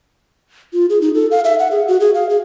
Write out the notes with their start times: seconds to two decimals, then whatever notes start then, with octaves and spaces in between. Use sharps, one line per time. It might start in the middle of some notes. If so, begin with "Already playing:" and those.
0.73 F4
0.90 G#4
1.01 D#4
1.14 A4
1.31 F5
1.45 E5
1.59 F#5
1.71 G#4
1.88 F#4
2.00 G#4
2.14 F5
2.29 G#4